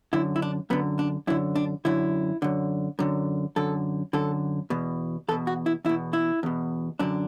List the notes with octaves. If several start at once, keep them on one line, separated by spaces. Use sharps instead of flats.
F#2 D3 E4
E4
D4
F#2 D3 B3
D4
F#2 D3 E4
D4
F#2 D3 E4
F#2 D3
F#2 D3
F#2 D3 A4
F#2 D3 A4
E2 B2
E2 B2 A4
F#4
E4
E2 B2 E4
E4
E2 B2
F#2 D3 D4